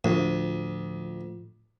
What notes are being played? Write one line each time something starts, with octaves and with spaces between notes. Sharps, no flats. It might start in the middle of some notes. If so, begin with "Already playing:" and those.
D2 A2 F3